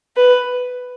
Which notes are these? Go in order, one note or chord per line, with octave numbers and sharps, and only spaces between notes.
B4